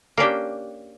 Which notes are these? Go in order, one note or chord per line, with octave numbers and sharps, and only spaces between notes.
A#3 C#4 D4 G4